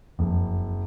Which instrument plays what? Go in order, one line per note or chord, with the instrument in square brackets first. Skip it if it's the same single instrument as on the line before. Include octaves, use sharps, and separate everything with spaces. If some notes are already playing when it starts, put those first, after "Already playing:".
[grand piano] F#1 [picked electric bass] F2